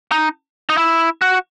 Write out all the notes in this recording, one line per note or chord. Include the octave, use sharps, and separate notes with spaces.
D#4
D#4
E4
F#4